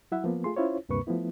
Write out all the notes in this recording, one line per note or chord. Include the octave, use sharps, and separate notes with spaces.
F#3 E4 E5 F#5
F3 A#3 B3
A3 F4 G#4 C6
C#4 E4 F4 C5 C#5
D2 G2 C3 A#3 B4 C#6
F3 A3 B3 E4